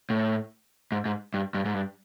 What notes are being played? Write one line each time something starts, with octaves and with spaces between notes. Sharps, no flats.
A2
G#2
G#2
G2
G2
G#2
G2